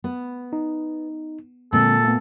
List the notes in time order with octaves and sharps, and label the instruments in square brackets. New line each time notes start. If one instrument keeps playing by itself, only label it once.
[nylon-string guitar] B3
[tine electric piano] D#4
[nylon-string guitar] A#2 [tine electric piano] D3 G#3 C4 [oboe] A4
[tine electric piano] A3 B3